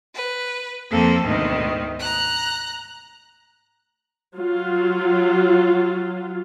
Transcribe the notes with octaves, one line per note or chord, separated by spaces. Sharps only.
B4
F2 A#3 C4 A4
D2 G#2 B2 D#3
A#5 F#6
F#3 F4